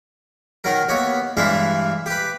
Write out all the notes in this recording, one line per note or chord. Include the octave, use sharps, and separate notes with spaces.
D#3 F#3 A#4
D#2 B3 C#5
G2 E3 G#3 E4 F5
G4 B4